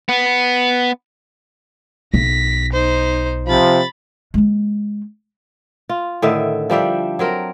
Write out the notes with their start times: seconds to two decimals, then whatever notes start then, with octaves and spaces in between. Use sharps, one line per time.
0.09 B3
2.14 B1 A#6 B6
2.73 D#4 C5
3.48 C3 F3 B5 A6
4.34 G#3 A#3
5.89 F4
6.22 A2 D3 D#3 E5
6.70 F3 G3 D4 E5
7.19 F#3 C4 A#4